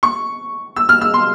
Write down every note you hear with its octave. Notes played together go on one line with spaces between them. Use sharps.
C#6
E6
F6
E6
C6